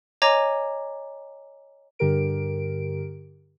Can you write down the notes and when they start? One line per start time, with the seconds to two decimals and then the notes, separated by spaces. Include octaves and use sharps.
0.22 C#5 D#5 G#5 A#5 D6 G#6
1.99 G2 D3 G4 A#4 D7